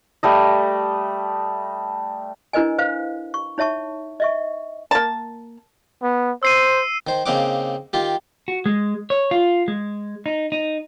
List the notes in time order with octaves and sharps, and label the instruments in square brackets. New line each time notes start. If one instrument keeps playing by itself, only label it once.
[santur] G3 A3 D#5
[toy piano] D4 E4 A#4 B4 D#5 G#5
B4 C5 F5
C#6
D#4 C#5 E5 A5 C#6
D#5 E5 C#6
[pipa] A#3 A5
[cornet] B3
[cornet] C5 [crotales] E6 C7 D#7
[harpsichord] D#3 C5
C#3 A#3 C4 D#4 F#5 D6
D#3 F4 G4
[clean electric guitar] F#4
G#3
C#5
F4
G#3
D#4
D#4